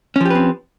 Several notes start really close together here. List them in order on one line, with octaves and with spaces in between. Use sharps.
C#4 F3 G4 B4 C4